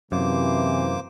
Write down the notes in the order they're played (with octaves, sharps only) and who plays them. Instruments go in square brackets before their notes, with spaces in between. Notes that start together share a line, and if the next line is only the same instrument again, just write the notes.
[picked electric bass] F#2 [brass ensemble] C3 E3 [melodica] A#3 C5 D6